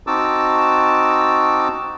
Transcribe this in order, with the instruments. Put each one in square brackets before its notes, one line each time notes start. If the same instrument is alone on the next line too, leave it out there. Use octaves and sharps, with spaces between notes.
[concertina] C4 D#4 F#4 A5 D6 E6